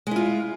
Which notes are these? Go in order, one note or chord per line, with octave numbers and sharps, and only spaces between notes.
G#3 E4 F4